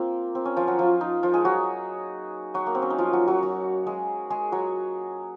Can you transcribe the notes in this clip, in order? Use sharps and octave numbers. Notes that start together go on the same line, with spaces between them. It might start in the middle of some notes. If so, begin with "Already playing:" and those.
Already playing: A#3 C4 F4
C4
C#4
F3 F4
F#3 F#4
F3 F4
D#4
F3 F4
G#3 G#4
F#3 F#4
F#3 F#4
A#3
C4
C#4
D#4
F3 F4
F#3 F#4
F#3 F#4
F#3 F#4
G#3 G#4
G#3 G#4
F#3 F#4